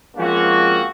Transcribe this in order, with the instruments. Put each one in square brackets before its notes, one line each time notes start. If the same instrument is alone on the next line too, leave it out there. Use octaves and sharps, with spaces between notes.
[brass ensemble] F3 G#3 A#3 C4 C#4 F#4